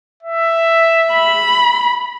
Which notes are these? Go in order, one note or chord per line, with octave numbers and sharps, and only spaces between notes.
E5
B5